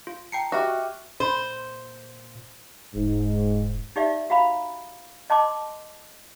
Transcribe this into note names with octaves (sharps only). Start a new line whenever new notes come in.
F4
G5 A5 A#5 C7 C#7
F#4 G4 D#5 E5 F#5 C#6 F6
A#2 C5
E1 G#2
D#4 G4 D5 E5
F#4 F5 A#5 B5
D#5 A5 C6 D6